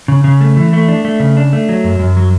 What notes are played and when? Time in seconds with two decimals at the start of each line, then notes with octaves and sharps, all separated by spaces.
0.08 C#3
0.24 C#3
0.41 A3
0.57 E3
0.73 A3
0.88 D4
1.05 A3
1.20 C#3
1.37 D4
1.53 A3
1.69 F#3
1.84 F#2
1.99 F#2
2.17 F#3